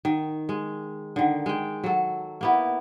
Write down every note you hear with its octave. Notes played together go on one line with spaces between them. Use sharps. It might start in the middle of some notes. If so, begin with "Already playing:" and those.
D#3
G#3
D3 D#3
G#3 G5
F#3 A4
A#3 B3 E4